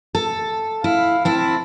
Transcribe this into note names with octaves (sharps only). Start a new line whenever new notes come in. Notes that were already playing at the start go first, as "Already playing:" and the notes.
A4
E4 F5
C4 E4 A5